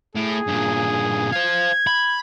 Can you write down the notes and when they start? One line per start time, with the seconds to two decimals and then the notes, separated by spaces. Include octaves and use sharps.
0.15 A2 G#4
0.47 G2 A#2
1.32 C5 F5 G#6
1.87 B5